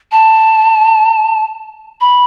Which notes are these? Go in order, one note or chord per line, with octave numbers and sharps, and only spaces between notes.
A5
B5